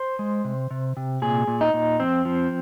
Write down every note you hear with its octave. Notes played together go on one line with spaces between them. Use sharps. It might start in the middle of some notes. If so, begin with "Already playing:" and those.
Already playing: C5
G#3
C3
C3
C3
A#2 G#4
A#2
D#4
A#2
F2 C4
F3